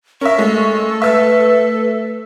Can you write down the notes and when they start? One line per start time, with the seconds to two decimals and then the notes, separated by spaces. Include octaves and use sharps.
0.21 C#4 A#4 E5 C#6
0.38 G#3 A3 A4
1.02 B4 E5 E6